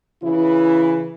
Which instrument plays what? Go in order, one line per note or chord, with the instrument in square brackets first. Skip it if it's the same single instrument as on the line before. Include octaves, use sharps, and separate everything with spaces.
[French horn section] C#3 E3 E4